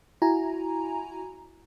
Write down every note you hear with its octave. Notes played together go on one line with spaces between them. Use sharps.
E4 F#4 G#5 A#5